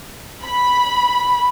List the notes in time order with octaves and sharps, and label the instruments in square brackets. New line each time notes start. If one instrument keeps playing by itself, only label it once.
[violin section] B5